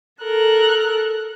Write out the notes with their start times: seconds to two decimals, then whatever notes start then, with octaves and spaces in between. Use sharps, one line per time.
0.22 A4 A#4 F#6